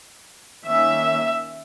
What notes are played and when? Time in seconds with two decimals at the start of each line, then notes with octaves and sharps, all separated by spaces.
0.66 D#3 A#3 C#4 E5